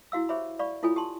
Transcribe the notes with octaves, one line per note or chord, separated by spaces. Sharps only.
E4 F#4 F5 E6
G4 G#4 C5 C#5 E5 B5
D5 F5 B5 C#6
E4 F4 A4 C#5 G#5 B5
G4 A5 C6